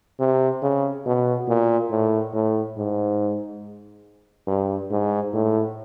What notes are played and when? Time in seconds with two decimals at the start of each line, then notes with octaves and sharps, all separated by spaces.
0.19 C3
0.62 C#3
1.06 B2
1.48 A#2
1.90 A2
2.33 A2
2.77 G#2
4.47 G2
4.91 G#2
5.34 A2